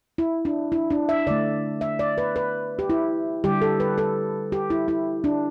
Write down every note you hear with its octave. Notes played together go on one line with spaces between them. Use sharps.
E4
D4
E4
D4
E5
D3 A3 D5
E5
D5
B4
B4
G4
E4
D3 G3 G4
A4
B4
A4
G4
E4
E4
D4